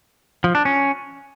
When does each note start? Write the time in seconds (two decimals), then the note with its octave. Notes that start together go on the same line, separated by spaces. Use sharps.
0.44 F3
0.55 D4
0.65 C#4